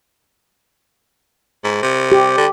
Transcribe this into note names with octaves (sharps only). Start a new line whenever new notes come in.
G#2
C3
G4
D3